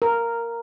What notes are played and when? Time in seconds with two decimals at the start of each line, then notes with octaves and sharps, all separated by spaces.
0.02 A#4